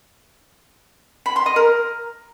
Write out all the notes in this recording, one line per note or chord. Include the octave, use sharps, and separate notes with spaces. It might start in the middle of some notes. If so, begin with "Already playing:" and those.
B5
C6
D#5
A#4